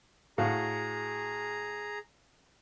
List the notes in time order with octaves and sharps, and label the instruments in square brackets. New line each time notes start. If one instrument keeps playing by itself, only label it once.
[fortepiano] A2 F#4 F5 [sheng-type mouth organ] G#4 A#5